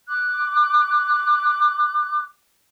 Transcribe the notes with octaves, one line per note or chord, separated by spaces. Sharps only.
D6 F#6